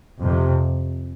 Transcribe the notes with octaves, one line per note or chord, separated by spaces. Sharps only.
F2 C3